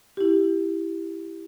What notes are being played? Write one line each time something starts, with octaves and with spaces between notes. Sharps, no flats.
E4 G4